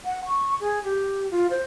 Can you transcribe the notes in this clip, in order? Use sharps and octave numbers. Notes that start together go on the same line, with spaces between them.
F#5
C#6
G#4
G4
F4
C5